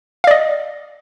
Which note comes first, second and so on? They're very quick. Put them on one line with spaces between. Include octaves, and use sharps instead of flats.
F5 D5 D#5